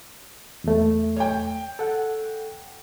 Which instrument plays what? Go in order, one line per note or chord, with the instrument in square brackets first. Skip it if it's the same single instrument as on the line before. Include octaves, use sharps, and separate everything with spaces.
[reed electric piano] E2 A3
[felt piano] C#5 G5
[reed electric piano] A4 F#5